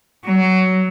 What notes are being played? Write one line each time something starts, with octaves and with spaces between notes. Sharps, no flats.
F#3